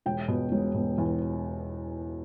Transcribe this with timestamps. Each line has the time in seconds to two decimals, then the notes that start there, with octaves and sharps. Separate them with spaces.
0.06 E1 G5
0.28 B2
0.52 E1
0.74 B2
0.98 E2